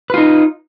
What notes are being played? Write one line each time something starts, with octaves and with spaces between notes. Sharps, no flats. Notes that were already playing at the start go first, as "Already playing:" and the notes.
D#4 F4 B4